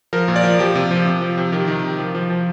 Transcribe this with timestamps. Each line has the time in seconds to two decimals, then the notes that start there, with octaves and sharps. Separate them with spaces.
0.13 F3 A#4
0.28 A#2
0.36 D5
0.43 F3
0.59 F3 G4
0.75 C3
0.91 F3
1.05 C3
1.21 F3
1.38 C3
1.52 D#3 G4
1.68 D#3
1.84 C3
1.98 F3
2.15 F3
2.30 F3